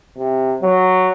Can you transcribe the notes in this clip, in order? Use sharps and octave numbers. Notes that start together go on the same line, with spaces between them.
C3
F#3